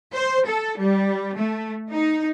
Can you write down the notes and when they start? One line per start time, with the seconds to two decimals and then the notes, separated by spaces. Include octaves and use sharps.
0.14 C5
0.47 A4
0.78 G3
1.36 A3
1.91 D#4